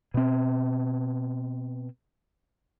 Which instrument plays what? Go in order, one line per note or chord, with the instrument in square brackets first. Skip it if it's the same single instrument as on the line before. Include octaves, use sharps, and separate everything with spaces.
[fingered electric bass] B2 C4